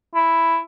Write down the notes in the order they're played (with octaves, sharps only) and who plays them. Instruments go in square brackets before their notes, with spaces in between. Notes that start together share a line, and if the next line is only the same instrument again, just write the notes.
[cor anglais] E4